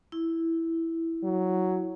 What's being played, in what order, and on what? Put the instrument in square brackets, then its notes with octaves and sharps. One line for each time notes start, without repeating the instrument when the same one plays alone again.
[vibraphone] E4
[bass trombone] F#3